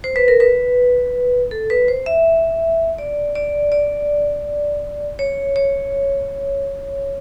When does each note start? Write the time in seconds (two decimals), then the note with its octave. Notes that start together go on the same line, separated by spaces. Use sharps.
0.04 C5
0.16 B4
0.28 A#4
0.40 B4
1.51 A4
1.70 B4
1.88 C5
2.06 E5
2.98 D5
3.35 D5
3.72 D5
5.19 C#5
5.56 C#5